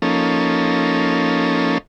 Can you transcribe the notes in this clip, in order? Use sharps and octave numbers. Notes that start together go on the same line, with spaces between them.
F3 A#3 C#4 D#4 A4